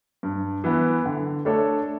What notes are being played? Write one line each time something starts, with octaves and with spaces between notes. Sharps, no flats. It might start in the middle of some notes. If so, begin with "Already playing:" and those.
G2
E3 B3
D3
A3 D4 A4 C#5